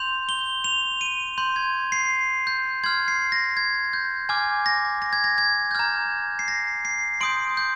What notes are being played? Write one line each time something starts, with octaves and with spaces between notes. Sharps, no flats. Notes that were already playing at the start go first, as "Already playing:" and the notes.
Already playing: C6 G6 F7
G7
F7
D#7
C6 G6
G#6
C7
G6
C6 F6 G#6
C7
A#6
G#6
G6
G#5 D6 F6 G#6
A#6
A#6
G#6
A#6
G#6
G6
A#5 F6 G#6
C7
A#6
C7
C6 D#6 G6 D7
G6